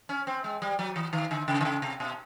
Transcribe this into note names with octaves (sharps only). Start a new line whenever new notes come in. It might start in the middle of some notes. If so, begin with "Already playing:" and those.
C#4
C4
G#3
G3
F#3
E3
D#3
D3
C#3
D3
C#3
C3
B2